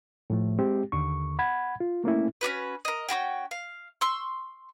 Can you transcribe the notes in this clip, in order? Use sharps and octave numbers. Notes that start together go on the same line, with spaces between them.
A2 F3 A3
G#3 C4 G4
D#2 D3 C#6
F#5 B5 G#6
F4
A3 A#3 C#4 E4
C#4 D4 F#4 B4
A#4 D#5
C#4 F4 F#4 G5
F5
C6 C#6 E6